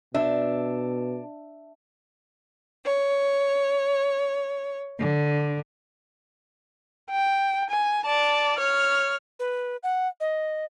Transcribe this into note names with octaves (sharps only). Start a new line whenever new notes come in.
B2 D4 E5
C#5
D3
G5
G#5
D5 A5
C#5 F6
B4
F#5
D#5